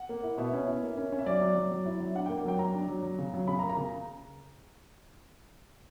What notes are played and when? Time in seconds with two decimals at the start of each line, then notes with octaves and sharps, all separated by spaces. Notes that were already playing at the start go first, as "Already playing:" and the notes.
Already playing: F#5
0.09 A#3
0.23 E4
0.38 B2 E5
0.53 C#4
0.68 E4
0.83 A#3
0.97 C#4
1.12 C#4
1.19 E5
1.26 F#3 D5
1.41 F#3
1.56 F#3
1.72 F#3
1.86 E4
2.00 F#3
2.15 D4 F#5
2.26 A#3 G5
2.45 F#3 G5
2.59 F#3 A#5
2.74 D4
2.88 F#3
3.03 F#3
3.18 C#3
3.34 F#3
3.48 C#3 B5
3.59 A#5
3.62 A#3
3.70 A#5
3.77 C#3